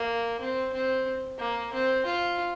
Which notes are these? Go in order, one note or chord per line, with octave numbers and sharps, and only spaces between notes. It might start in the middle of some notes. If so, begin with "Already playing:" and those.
Already playing: A#3
C4
C4
A#3
C4
F4